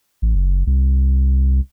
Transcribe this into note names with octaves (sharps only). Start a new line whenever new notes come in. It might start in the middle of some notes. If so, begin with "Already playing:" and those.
A1
F#1
C2